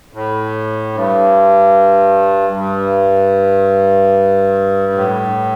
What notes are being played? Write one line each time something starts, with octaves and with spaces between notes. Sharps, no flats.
A2
G2
G2
A2